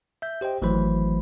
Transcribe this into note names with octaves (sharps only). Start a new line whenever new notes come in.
E5 G6
G4 C5 D#5 G5
G#1 E3 F#3 A3 C5 B5